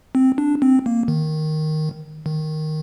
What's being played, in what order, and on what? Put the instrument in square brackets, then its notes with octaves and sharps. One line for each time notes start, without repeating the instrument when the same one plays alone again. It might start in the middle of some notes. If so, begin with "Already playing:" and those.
[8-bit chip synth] C4
D4
C4
A#3
D#3
D#3